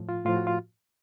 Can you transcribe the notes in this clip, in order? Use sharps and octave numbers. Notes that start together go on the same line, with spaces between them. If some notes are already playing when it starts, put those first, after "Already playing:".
Already playing: A2 F3
F4
A2 F3 F4
F#4
F4